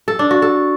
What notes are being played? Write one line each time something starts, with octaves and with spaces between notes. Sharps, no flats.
A4
D4
F#4
A4